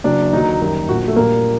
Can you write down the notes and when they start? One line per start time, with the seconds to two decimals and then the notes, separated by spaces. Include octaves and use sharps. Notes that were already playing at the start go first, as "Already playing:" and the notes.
0.04 F#1 F#2 F#3 D4
0.33 D#2 D3 F#3 D#4
0.61 F#2 D#3 G3
0.89 A#1 A#2 F#3 F#4
1.08 A3
1.16 A#1 A#2 G3 A#3